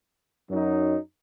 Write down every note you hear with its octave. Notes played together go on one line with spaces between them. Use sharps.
F#2 F#3 D#4